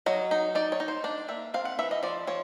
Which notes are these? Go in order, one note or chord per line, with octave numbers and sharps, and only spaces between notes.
F#3 D#5
D#4
D#4 D5
C#5
D#4
C5
D4 D5
A#3 E5
C4 F5
F#5
E3 E5
D#5
F3 D5
F3 C#5